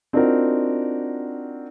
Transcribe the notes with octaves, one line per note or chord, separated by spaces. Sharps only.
C4 D4 D#4 F4 F#4 A#4